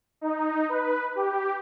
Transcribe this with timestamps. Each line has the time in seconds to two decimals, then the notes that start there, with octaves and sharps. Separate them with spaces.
0.21 D#4
0.69 B4
1.15 G4